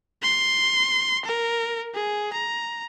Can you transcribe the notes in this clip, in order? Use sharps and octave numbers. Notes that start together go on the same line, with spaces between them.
C6
A#4
G#4
A#5